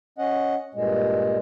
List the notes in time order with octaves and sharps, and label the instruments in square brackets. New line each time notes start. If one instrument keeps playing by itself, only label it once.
[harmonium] C#4 D#5 F#5
G2 A#2 G#3